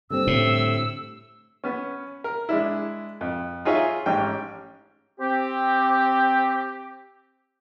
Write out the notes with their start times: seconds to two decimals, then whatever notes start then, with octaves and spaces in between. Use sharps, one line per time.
0.10 D3 G3 C4 E6
0.27 A2
1.64 B3 C#4
2.24 A#4
2.49 G#3 D4 E4
3.21 F2
3.65 D#4 F4 G#4 C#5 E5 F5
4.06 A1 G#2 C#4 G4 G5
5.20 C4 G4